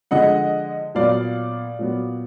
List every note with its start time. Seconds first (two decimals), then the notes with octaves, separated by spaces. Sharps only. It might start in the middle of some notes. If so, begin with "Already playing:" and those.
0.11 D3 F3 G#3 D#5 F#5
0.95 A#2 F#3 B3 D5 F5
1.79 A#2 F#3 B3